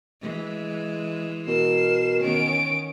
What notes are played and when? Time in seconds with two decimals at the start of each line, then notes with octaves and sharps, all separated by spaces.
0.21 E3 G#3
1.47 B2 A#4 C7 E7
2.19 D#3 B3 C#4 D7